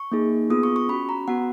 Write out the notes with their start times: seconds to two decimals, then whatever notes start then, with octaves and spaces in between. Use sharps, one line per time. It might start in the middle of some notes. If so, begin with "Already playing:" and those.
Already playing: C#6
0.12 A#3 D#4 G#4
0.50 B3 F4 G#4 D#6
0.63 C#6
0.76 C#6
0.89 C#4 F#4 B5
1.09 A#5
1.28 B3 F#4 F#5